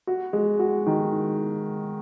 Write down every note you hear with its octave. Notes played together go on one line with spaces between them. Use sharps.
F#4
G#3
F#4
D#3